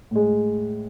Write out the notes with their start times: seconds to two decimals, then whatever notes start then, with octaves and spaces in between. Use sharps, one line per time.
0.11 A2 G#3